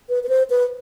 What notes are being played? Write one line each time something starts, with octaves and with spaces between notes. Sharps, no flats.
B4
B4
C5
B4